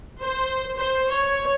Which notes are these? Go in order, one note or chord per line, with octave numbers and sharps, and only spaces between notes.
C5
C5
C#5